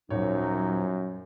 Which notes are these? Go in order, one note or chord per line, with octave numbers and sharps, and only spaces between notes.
D#1 F#2 F3 F#3 D#4 C#5